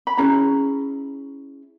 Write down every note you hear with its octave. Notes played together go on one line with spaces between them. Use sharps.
B5
C#4 E4 G#4 A#5